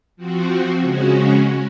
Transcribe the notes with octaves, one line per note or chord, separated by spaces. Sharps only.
F3 C4 F#4
C#3 G#3 C#4 F#4